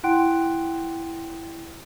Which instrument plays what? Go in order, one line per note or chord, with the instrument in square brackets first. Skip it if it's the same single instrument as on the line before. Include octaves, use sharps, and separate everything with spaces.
[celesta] E4 F#5 G5 C6 F#6 D7